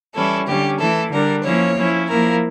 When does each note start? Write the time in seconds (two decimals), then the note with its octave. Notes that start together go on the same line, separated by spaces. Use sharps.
0.14 E3 G3 C#4 E4 A4
0.47 D3 G3 C#4 G4
0.79 E3 A3 E4 A4
1.11 D3 G3 D4 A#4
1.44 F3 A#3 C#4 E4 C#5
1.77 F3 C#4 E4
2.09 F3 A#3 E4 A#4